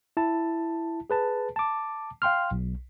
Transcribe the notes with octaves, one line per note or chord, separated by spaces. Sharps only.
E4 A5
G#4 B4 A5
A5 D6
F5 G5 C6 F6
B1